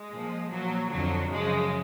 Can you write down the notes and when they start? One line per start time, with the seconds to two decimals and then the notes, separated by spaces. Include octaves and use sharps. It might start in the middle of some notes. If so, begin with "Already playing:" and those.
Already playing: G#3
0.11 A#2 F3
0.51 A#2 F3 F#3
0.91 F2 D3 F3 F#3
1.31 F#2 C#3 F3 G#3